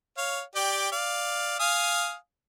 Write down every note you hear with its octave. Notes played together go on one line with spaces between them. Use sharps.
C#5 F5
G4 D5 G5
D5 F5
F5 G#5 D#6